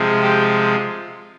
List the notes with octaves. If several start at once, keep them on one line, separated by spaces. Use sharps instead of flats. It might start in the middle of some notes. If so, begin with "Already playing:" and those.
Already playing: C3 F3 G#3
G4